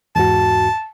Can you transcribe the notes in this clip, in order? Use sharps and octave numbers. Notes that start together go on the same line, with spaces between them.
E2 G#2 F#4 A5